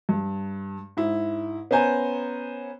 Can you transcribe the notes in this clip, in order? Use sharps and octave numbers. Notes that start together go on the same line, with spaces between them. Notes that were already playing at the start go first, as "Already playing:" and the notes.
G2
G#2 E4
B3 C#4 C5 G#5 A#5